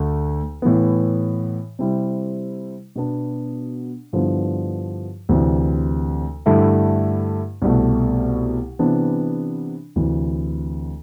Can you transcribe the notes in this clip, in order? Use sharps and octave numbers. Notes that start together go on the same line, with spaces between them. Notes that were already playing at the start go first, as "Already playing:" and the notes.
Already playing: D2 D3 A3
A2 E3 B3
C3 G3 C4 E4
B2 B3 D4
G2 D3 F3 B3 E4
D2 C3 E3
G2 D3 A3 E4
C2 B2 A3
C3 E3 B3 D4
D2 C3 E3